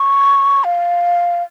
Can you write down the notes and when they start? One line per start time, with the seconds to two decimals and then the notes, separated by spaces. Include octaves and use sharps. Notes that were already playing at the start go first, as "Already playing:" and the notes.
Already playing: C#6
0.64 F5